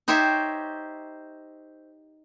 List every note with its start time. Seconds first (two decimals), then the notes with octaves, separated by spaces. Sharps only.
0.08 D#4 G4 C5 C#5 E5